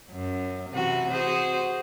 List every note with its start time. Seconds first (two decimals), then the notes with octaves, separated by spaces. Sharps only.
0.11 F#2
0.70 C3 E3 F#4
1.09 F#4 G#4 C5